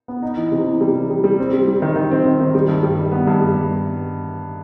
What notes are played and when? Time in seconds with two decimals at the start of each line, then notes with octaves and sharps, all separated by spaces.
0.08 B3
0.22 D#4
0.37 E3
0.52 C3
0.66 E3
0.81 G3
0.95 E3
1.10 G3
1.24 G3
1.39 C4
1.53 G3
1.67 G3
1.82 D#3
1.96 D#3
2.11 C4
2.25 C4
2.40 D#3
2.54 G3
2.68 G2
2.83 G3
2.98 D#3
3.12 B3
3.27 G2
3.41 G3
3.55 G2